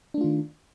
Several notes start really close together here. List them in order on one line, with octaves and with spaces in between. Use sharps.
D4 A3 F4 D#3